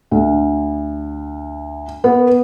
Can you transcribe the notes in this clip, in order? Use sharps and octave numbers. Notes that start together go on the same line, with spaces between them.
D2
B3